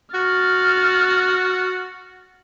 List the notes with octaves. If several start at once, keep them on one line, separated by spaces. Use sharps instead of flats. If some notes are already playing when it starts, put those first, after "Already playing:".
F#4 F6 A6